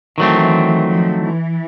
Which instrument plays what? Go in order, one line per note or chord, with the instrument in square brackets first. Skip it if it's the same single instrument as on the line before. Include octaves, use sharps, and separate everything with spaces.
[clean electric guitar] D#3 F#3 A3 C4 [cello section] E3
[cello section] F3
E3